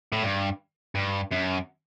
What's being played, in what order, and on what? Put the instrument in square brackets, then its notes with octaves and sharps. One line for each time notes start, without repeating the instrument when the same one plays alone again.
[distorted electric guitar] A2
G2
G2
F#2